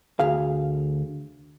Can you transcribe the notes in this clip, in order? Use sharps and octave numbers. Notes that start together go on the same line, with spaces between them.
D2 G#4 F5